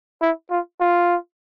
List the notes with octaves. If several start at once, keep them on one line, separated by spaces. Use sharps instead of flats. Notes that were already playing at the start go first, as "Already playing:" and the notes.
E4
F4
F4